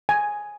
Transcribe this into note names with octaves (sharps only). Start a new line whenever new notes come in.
G#5